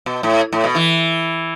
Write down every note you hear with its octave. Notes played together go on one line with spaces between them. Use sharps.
B2
A2
A2
B2
E3